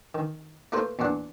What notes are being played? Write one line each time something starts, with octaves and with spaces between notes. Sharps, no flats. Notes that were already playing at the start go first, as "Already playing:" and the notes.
D#3
A3 A#3 E4 F4 B4 C5
E2 A#2 D4 F#5